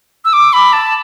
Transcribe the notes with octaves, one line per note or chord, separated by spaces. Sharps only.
E6
D6
B5
A5